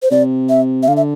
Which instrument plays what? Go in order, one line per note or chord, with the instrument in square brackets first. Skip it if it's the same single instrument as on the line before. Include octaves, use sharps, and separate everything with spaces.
[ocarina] C5
[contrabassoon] C3 [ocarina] D5
[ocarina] E5
E5
[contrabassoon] D3 [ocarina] F5
[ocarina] E5